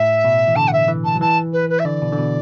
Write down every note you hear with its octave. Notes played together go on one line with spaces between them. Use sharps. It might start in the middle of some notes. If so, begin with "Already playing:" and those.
Already playing: A2 E5
B2
E3
D3 A5
F#5
E5
E3
A5
F#3
E3 A5
B4
B4
E5
D3 D5
B2
D3
B2